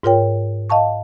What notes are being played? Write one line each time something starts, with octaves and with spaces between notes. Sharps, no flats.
G#2 F4 A#4 C#5 G5
D#5 F5 A5 C#6